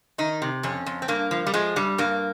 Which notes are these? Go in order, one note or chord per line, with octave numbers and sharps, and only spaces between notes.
D#3 D#4
C3
F2 C#4
F2
C4
G2 A#3
F3
G3
F3 G#3
G2 G3
G2 A#3